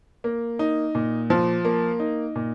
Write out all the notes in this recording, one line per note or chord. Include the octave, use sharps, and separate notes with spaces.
A#3
D#4
A#2
F3
A#3
D#4
A#2